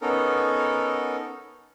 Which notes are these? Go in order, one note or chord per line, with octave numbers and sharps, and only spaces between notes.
B3 C#4 D#4 A4 A#4